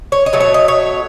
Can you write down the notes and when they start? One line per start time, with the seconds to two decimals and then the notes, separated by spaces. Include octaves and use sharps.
0.12 C#5
0.26 D#5
0.33 B2 F#3 A3
0.40 C#5
0.54 D#5
0.68 C#5